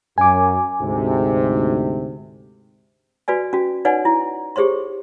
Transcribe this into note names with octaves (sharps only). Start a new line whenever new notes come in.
F#2 G#5 D6
D2 G#2 C3
F#4 B4 D5 G#5
C#4 F#4
D#4 B4 C#5 D5 F#5 G#5
E4
G4 G#4 C5 C#5 C6